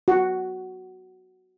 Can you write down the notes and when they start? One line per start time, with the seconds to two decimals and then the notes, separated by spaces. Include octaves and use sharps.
0.08 F#4